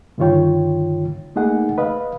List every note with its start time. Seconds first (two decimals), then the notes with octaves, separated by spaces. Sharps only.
0.18 G2 D3 D#3 F4 C#5 G5
1.36 A3 A#3 D#4 G#4 F#5
1.78 B4 D#5 F5